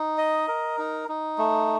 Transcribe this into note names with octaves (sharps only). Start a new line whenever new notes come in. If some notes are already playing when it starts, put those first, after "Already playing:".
Already playing: D#4
D#5
A#4
D#4
D#4
A3